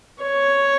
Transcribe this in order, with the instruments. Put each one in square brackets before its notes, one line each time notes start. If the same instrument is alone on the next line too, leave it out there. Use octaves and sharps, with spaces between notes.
[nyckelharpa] C#5